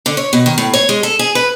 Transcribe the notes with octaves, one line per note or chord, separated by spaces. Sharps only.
D3
C#5
B2
D#3
A2
C#5
G#3
A4
G#4
B4